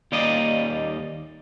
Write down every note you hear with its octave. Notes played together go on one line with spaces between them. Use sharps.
D#2 G3 A#3 D5 D#5